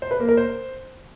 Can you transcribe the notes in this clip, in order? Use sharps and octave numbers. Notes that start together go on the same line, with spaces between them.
C5
B4
A#3
A#4
C5